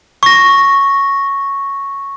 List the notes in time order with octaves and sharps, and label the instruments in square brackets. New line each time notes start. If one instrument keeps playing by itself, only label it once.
[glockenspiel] C#6 A#6